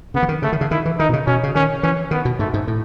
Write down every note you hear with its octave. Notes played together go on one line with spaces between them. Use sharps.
C#3 B3
E3
D#3
C#3 A3
D#3
C#3
D#3 E4
E3
D#3 D#4
B2
C#3
B2 C#4
C#3
D#3 C#4
E3 C#4
D#3 B3
B2
G#2 A3
G#2
A2